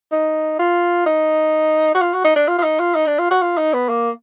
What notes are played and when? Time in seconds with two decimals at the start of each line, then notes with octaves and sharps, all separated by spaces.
0.12 D#4
0.59 F4
1.06 D#4
1.95 F#4
2.01 F4
2.13 F#4
2.24 D#4
2.36 D4
2.48 F4
2.58 F4
2.63 D#4
2.79 F4
2.95 D#4
3.07 D4
3.19 F4
3.31 F#4
3.42 F4
3.58 D#4
3.74 B3
3.89 A#3